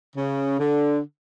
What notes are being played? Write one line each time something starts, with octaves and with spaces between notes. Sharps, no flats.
C#3
D3